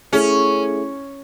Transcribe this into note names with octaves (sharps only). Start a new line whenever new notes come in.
A3 C#4 E4 G#4